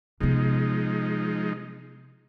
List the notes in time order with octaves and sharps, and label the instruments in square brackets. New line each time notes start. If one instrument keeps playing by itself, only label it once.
[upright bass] C3 B3 [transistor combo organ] F3 G#3 D#4